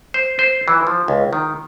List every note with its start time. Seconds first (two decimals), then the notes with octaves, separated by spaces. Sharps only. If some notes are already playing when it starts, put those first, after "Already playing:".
0.14 C5
0.39 C5
0.68 E3
0.87 F3
1.08 C#2
1.33 D#3